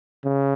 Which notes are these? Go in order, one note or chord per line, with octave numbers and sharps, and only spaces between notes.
C#3